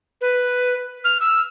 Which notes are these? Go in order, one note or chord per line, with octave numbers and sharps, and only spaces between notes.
B4
F6
E6